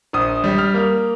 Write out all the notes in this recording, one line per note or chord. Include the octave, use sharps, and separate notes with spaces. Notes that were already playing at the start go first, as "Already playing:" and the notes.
A#1 D#6
G3
F6
A#3